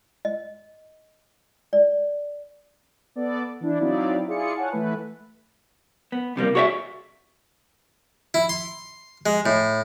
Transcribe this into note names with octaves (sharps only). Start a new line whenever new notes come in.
D#5
D5
B3 A4 D5
E3 D4 E4
F#3 C4 D#4 E4 D5 F5
E4 F4 G#4 D5 C#7
C#5 F5 F#5 G#5 A5
E3 A3 E4 B4
B3
C2 C3 G3 A#3
F#4 G#4 C#5 D5 E5
E4
C6
G#3
A2